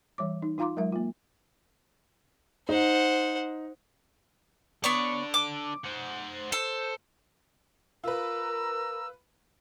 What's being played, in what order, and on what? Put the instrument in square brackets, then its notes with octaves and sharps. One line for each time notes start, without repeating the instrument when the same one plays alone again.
[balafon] E3 G3 C#5 D6
D#4
D#4 F4 F5 A#5 C6 D6
F#3 G#3 A#4 E5
A#3 F4
[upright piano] D#4 [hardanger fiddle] C5 F#5
[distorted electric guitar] D3 D5 [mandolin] B3 C#5 C#6
[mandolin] D6
[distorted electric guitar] C5 F#5
[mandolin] A4 [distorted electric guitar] C5
[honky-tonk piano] F4 B4 [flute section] A#4 [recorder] E6